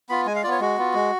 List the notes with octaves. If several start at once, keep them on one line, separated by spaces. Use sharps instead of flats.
B3 F4 B5
G#3 G#5
F5
B3 F4 C#5 D5
G#3 F#4
B3 F4
G#3